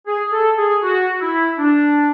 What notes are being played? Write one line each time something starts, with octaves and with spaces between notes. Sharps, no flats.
G#4
A4
G#4
F#4
E4
D4